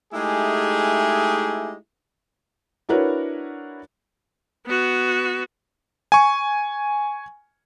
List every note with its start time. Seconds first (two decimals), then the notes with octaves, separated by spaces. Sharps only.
0.13 G#3 A3 D#4 E4 G4 G#4
2.89 D4 E4 F#4 A#4 B4 C#5
4.66 B3 F#4
6.12 G#5 C#6